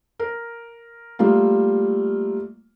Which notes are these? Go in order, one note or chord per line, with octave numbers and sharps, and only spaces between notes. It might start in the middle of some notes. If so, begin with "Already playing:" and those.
A#4
G3 A3 A#3 F4